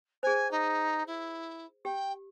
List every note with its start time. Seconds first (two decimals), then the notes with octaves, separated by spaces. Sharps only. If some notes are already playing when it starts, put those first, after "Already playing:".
0.23 G#4 C5 G#5
0.51 D#4
1.07 E4
1.85 G4 G5